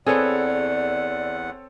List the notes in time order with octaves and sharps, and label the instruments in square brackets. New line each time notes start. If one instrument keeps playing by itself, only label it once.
[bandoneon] E2 F#5 [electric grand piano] C4 A4 C#5 [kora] G#4 B4 [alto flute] D5